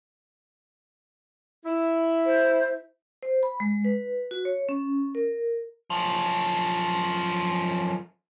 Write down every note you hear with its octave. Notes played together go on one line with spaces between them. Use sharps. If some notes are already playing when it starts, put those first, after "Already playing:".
E4
C5
C5
B5
G#3
B4
F#4
C#5
C#4
A#4
F#2 F3